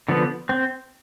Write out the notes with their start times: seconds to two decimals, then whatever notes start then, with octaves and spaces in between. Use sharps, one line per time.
0.09 D3 F3 B3
0.49 C4